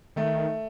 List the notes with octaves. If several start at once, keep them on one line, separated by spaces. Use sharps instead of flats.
D#3 A3